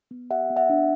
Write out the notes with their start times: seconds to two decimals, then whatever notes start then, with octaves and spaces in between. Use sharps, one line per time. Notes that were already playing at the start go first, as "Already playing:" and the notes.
0.11 B3
0.30 G4 E5 F#5
0.50 B3
0.57 E5 F#5
0.70 D4